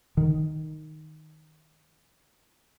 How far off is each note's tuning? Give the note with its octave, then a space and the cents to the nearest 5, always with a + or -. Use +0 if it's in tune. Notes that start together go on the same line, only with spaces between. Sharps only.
D#3 +0